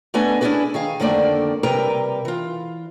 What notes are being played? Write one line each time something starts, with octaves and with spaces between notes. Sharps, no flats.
A3 B3 D4 B4 D#5 G#5
C#4 D4 E4 G4 G#4 B4
D#3 G#4 F5
F2 D3 D#3 A3 A#3 D5
C3 G3 A#4 B4 G5 A#5
E3 F4